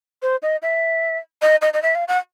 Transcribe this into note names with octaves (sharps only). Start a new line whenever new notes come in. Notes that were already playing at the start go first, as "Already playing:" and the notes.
C5
D#5
E5
D#5
D#5
D#5
E5
F5
F#5